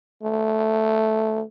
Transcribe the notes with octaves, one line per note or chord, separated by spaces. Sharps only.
A3